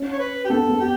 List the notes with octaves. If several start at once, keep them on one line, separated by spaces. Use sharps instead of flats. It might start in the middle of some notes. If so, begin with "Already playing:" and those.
Already playing: C#4
C#5
B4
G4
B3 A4
B3
G4